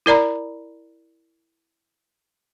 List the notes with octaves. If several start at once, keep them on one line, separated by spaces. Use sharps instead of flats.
E4 A#4 D5 A#5 B5